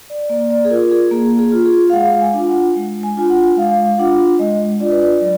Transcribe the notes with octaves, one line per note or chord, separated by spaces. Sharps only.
D5
A#3 D5
D5
G#4
F4 A#4
G#4
A#3 G#4
G#4
F4
G#4
F5
G#3 F#5
G#5
D4 F4
F#5
G#3
G#5
D4 F4 G#5
F#5
G#3 F5
D4 F4 F#5
G#3 D#5
D4 F4 D5
B4
D5
F#3 D5